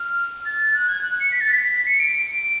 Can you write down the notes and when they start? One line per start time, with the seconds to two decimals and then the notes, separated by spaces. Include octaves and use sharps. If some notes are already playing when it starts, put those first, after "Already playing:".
Already playing: F6
0.45 A6
0.74 F#6
0.88 G#6
1.02 F#6
1.20 C#7
1.31 B6
1.41 A6
1.52 B6
1.87 C#7
2.00 D7